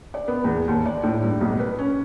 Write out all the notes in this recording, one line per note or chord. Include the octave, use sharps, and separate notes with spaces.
D5
B3
E2
D#2
D5
A2
G2
B1
B4
C#4